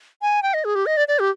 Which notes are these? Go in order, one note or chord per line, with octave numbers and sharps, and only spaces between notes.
G#5
G5
D#5
G#4
G4
D#5
D5
D5
G4